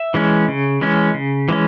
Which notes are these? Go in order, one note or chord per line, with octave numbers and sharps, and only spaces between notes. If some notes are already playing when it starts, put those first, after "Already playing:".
Already playing: E5
E3 G#3 C#4
C#3
E3 G#3 C#4
C#3
E3 G#3 C#4